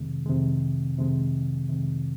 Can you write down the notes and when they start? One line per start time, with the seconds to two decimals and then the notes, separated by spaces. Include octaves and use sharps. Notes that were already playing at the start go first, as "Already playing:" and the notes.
Already playing: F2 C3 D#3 G#3
0.26 F2 C3 D#3 G#3
0.97 F2 C3 D#3 G#3
1.68 F2 C3 D#3 G#3